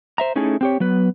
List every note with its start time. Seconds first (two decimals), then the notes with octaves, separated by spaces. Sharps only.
0.18 C5 E5 A#5
0.36 A3 C#4 D#4 E4 G#4 A4
0.61 C4 G4 C#5
0.80 F#3 B3 B4